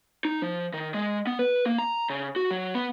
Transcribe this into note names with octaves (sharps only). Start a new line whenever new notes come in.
D#4
F3
D#3
G#3
B3
B4
A#3
A#5
C#3
F#4
F#3
B3